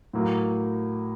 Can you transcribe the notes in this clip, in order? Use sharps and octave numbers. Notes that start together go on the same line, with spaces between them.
A2 F#3 A#3